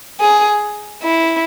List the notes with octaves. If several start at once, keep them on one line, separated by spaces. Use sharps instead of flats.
G#4
E4